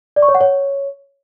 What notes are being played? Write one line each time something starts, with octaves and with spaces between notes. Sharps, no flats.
D5
C#6
C#5
F#5
C#5